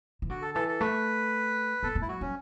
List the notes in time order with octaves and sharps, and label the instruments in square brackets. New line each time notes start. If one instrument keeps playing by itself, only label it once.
[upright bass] E3
[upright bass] D3 [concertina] F#4
[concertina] A4
[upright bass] E3 [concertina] A4
[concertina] A4
[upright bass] A3 [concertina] B4
[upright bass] B3 [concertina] A4
[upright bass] A3
[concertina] E4
[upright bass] F#3 [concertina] F#4
[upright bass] F#3 [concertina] C#4